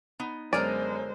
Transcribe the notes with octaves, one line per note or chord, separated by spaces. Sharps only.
B3 D#4
F#2 D3 G#3 B3 A#4 C5 D5 G#5